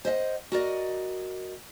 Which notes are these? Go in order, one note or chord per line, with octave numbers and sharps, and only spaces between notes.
C5 D#5 E5 F#5
F#4 A#4 D5 D#5